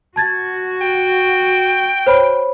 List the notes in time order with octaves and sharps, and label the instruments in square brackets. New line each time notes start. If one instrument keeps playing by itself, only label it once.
[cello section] F#4 [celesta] A5 G#6 A6
[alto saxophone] G5
[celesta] C5 C#5 B5